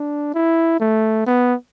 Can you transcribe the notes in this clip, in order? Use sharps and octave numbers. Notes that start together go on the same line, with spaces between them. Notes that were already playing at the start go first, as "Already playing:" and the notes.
Already playing: D4
E4
A3
B3